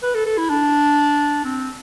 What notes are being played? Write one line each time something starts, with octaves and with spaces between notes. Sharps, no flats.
B4
A4
A4
E4
D4
C4